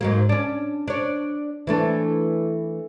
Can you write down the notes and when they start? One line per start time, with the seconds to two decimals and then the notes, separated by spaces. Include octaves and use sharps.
0.01 G#2 F#3 A#3
0.29 C#4 D4
0.88 D4 C#5
1.67 E3 A3 D4